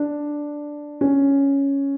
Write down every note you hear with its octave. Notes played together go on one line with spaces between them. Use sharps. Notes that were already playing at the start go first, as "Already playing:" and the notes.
Already playing: D4
C#4